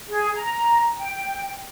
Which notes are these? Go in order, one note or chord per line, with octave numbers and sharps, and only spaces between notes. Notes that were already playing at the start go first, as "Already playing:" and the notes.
G#4
A#5
G5